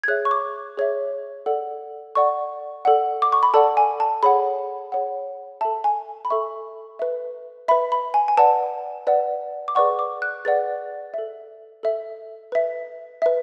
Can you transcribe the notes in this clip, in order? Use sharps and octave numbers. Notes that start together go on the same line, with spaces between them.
G#6
G#4 C#5 E5 F#6
C#6
D6
G#4 C#5 E5
A4 D5 F#5
A4 D5 F#5 C#6
A4 D5 F#5
D6
C#6
B5
A4 D5 F#5 A5
G#5
A5
G#4 C#5 F#5 B5
G#4 C#5 F#5
A4 E5 A5
G#5
B5
A4 E5 C#6
B4 E5
B4 E5 B5
B5
G#5
G#5
B4 D5 F#5 A5
B4 D5 F#5
D6
G#4 B4 D5 F#5 C#6
D6
F#6
G#4 B4 D5 F#5 A6
A4 E5
A4 E5
B4 E5
B4 E5